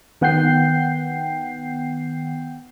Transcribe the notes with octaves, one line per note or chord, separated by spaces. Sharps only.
D#3 B3 F#5 G5 G6 C7